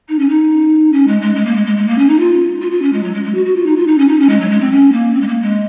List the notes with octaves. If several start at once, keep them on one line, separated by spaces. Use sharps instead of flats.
D#4
C#4
D#4
C#4
G#3
G#3
G#3
A#3
G#3
G#3
G#3
A#3
C#4
D#4
F4
F4
F4
C#4
G#3
F#3
G#3
G#3
F#4
F#4
F4
D#4
F4
D#4
C#4
D#4
C#4
G#3
F#3
G#3
C4
C#4
A#3
C4
G#3
A#3
G#3